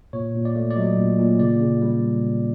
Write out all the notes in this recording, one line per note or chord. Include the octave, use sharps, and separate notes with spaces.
A#2 C#5
A#2
D5
A3
D5
F#3 D#5
A#2
A#2
C#3 D5
C#3
G3